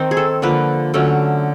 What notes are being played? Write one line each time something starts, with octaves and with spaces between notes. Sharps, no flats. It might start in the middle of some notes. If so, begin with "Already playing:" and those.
Already playing: D#3 C4 D#4
G#4
A4
D3 F3 A#3 B4
D3 F#3 A3 C#4